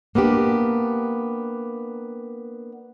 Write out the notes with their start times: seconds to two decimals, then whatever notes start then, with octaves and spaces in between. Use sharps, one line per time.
0.15 A#3 B3 D4 G4